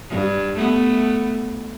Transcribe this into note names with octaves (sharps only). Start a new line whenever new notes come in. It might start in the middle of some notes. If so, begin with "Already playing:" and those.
G2
A3 B3